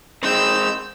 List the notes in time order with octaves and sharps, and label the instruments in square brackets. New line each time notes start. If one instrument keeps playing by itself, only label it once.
[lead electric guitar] G#3 C4 [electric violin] E6 G6